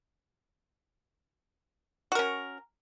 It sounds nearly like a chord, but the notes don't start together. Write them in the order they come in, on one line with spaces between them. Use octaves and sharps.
F#4 A#4 C#4